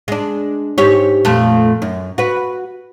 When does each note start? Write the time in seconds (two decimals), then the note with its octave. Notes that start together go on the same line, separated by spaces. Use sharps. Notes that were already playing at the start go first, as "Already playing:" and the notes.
0.08 G#3 D4
0.78 G#2 G4 C#5
1.25 F2 A#2 A3
1.82 F#2
2.18 F#4 B4